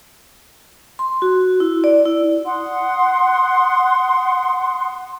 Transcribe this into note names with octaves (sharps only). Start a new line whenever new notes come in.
C6
F#4
E4
D5
E4
F#5 C6 D#6